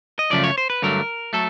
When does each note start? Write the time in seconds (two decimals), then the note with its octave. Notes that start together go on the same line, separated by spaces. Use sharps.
0.19 D#5
0.31 F#2 C#3 F3 A3 D5
0.44 C#5
0.58 C5
0.70 B4
0.82 G2 D3 F#3 A3 A#4
1.33 F#3 A3 A4